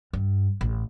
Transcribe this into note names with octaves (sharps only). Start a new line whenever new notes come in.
G2
A1